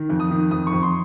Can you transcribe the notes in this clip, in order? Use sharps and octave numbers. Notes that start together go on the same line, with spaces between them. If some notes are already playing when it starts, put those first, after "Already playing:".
Already playing: D#3
F2
D#6
D#3
F2 D#6
C#6
F2
C6